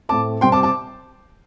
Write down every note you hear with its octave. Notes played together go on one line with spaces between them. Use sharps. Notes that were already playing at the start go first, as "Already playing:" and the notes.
A2 A3 C4 A5 D6
C3 G3 C4 G5 C6
A5 D6
A5 D6